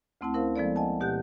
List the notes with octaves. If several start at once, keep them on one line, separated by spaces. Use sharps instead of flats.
D2 A3 C4 E4 F#5 A5
C#4 E4 A#4 C5 F5
F3 G#3 B3 A4 D5
D#5 F#5 G#5 A5
D2 B2 G4 F#5 F#6 G6